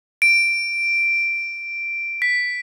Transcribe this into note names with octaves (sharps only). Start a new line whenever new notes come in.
D7
B6